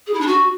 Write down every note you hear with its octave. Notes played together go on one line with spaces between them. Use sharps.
G#4
E4
D4
F#4